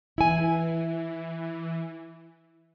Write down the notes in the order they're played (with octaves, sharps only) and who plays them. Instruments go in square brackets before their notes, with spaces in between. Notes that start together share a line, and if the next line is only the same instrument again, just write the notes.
[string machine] E3 [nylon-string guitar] E4 G#5